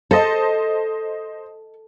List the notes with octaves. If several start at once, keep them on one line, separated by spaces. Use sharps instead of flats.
A4 C5 D#5 A5